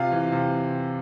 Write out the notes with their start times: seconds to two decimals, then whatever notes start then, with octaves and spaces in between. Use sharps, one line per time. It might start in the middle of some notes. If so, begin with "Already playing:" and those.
Already playing: C3 F4 F5
0.12 E3
0.32 C3